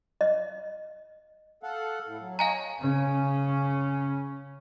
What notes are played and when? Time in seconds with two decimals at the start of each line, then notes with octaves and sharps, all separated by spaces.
0.21 D#5
1.63 A4 F5 F#5
2.06 A2
2.21 F#3
2.39 C#5 D#5 F5 G#5 A#5
2.80 C#3 C#4